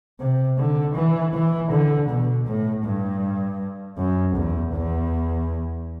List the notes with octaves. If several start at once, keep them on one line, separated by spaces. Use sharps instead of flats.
C3
D3
E3
E3
D3
B2
A2
G2
F#2
E2
E2